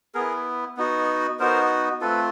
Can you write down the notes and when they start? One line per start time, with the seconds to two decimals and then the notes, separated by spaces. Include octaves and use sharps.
0.15 B3 E4 G#4 A#4
0.77 B3 D#4 F#4
1.40 B3 D#4 F#4 A#4 C5
2.01 A3 C4 F4 A4 B4